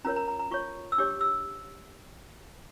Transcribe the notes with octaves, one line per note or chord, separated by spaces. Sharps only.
C#4 F4 A#4 C#5 A#5
A#5
A#5
A#5
F4 C#5 C#6
E6
D4 G4 C#5 D6
E6